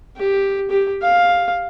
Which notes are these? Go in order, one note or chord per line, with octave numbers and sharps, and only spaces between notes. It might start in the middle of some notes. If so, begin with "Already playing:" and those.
G4
G4
F5